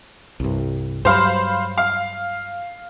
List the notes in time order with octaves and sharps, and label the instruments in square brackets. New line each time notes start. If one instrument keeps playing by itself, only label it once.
[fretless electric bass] C2 G2
[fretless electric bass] G2 F#3 [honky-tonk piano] C5 F5 B5
[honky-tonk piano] F5